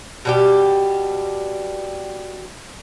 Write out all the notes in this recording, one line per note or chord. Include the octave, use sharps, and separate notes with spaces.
B2 G3 G4